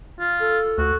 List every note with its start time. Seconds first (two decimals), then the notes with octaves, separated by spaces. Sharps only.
0.20 F4
0.40 A4
0.78 D2 F#4